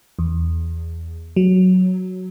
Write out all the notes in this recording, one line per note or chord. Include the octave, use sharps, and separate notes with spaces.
E2
F#3